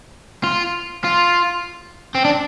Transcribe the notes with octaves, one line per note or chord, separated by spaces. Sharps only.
F4
F4
C4
D4